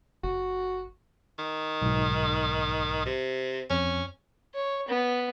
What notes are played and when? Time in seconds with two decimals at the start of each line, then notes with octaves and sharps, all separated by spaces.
0.23 F#1 F#4
1.39 D#3
1.82 B1 G#2
3.06 C3
3.70 F2 C#4
4.55 C#5
4.88 B3